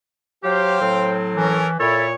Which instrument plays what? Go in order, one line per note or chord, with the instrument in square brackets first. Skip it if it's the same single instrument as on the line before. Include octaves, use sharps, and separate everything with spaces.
[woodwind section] F#3 G4 [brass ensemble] C5 F5 G5
[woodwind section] A2 F#3 C4
[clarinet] E3 [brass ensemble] C#4 A4 A#4
[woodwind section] A#2 C#5 [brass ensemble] E4 [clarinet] A4